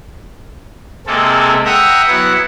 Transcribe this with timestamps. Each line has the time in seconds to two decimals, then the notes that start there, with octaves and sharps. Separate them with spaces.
1.07 C3 G#3 A#3 C4 A4
1.65 E5 F#5 G5 A#5 D#6 F#6
2.07 F#3 B3 E4 F#5